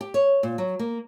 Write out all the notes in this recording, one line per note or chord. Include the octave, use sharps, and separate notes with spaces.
G4
C#5
A#2
F#3
A#3